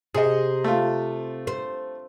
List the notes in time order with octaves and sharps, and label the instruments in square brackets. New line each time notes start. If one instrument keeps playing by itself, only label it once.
[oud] C3 [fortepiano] G#4 D#5
[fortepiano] A3 F4
[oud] C5